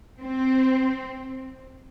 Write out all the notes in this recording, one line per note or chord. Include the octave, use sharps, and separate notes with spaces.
C4